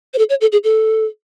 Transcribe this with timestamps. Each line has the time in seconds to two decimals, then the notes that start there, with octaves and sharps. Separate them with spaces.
0.14 C5
0.18 A4
0.30 C#5
0.41 A4
0.52 G#4
0.64 A4